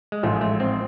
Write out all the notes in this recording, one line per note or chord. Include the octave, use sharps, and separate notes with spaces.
G#3
A1 G#2 F3 A3
A3
C4